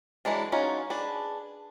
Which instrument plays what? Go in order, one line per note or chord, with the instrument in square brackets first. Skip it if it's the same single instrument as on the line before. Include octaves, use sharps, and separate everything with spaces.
[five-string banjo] E3 F#3 G#3 D4
C#4 D#4 F4 F#4 C#5
D4 G#4 B4